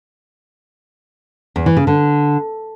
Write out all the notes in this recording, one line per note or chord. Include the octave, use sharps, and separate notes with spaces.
E2
E3
C#3
D3